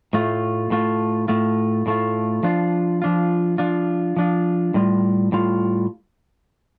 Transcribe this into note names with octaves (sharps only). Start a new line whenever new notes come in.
A2 A3 F4
A2 A3 F4
A2 A3 F4
A2 A3 F4
F3 D4 F4
F3 D4 F4
F3 D4 F4
F3 D4 F4
A2 G3 F4
A2 G3 F4